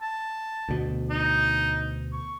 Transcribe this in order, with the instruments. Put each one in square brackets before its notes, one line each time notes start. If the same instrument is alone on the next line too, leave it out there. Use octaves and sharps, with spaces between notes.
[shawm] A5
[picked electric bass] D2 B2
[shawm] D#4
C#6